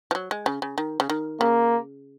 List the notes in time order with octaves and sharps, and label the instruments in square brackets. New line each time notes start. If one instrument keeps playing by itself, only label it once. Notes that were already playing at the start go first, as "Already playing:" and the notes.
[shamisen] F3
F#3
G#3
C#3
C#3
D#3
C#3
D#3
[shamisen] C#3 [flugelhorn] A#3